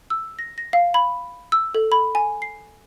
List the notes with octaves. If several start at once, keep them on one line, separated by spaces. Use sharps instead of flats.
E6
A#6
A#6
F5
B5
E6
A4
B5
G#5
C7